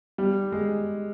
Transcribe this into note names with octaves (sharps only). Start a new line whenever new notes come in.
G3
G#3